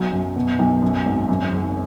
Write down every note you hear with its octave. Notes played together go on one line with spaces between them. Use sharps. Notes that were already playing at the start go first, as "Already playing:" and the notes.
Already playing: B1 F#3
F#2
B2
B1
F#2
G#1
F#2
F#1